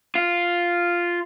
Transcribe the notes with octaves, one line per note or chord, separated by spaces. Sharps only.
F4